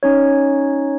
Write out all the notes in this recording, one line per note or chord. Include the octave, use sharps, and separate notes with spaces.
C#4 D#4 C#5